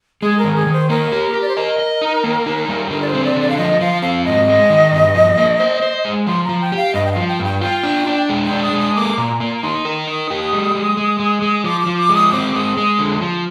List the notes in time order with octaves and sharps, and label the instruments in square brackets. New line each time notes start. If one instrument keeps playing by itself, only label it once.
[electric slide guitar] G#3 [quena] G#4
[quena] A#4
[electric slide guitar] D#3
[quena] G#4
[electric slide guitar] D#3
[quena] C5
[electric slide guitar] A#3 [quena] A#4
[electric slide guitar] G4
G4
[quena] D5
C5
[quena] A#4 [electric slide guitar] D#5
[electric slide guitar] D#5
D#4
A#3
D#4
G3
[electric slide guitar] D3 [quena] A#4
[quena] D5
C5
[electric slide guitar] C4
[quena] D5
[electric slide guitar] D3
[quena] D5
F5
[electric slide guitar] F3 [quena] D#5
[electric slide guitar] F3 [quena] F5
[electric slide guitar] C4 [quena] F5
[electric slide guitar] G#2 [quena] D#5
[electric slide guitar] G#3
D#3
G2
F3
A#3
C5
C5
G#3
[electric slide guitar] F3 [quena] C6
[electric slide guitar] F3 [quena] A#5
[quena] G5
[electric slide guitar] G4 [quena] F5
[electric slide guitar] G2 [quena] D#5
[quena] G5
[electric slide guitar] F3 [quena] F5
[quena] G5
[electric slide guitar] G2
[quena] G5
[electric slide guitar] F4 [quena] G5
[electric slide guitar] D4
D4
G#3
[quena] G5
[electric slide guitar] D4
[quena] D#6
[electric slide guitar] G#3
[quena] D#6
[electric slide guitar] A#3 [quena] D6
[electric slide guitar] A#2 [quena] A#5
[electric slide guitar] A#3 [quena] A#5
[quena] A#5
[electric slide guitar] D#4 [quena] C6
[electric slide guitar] A#4
[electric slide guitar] D#4 [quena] D#6
[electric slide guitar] G4
G#3
G#3
G#3
G#3
G#3
[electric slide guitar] F3 [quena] D6
[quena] D6
[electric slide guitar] F3
[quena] D6
[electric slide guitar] G#3
[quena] D#6
[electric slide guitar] C4 [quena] D6
[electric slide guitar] G#3 [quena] D#6
[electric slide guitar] G#3 [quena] D#6
[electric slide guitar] D3
F3